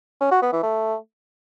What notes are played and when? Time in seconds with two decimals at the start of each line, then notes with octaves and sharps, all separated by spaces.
0.21 C#4
0.31 F#4
0.42 B3
0.52 E3
0.63 A3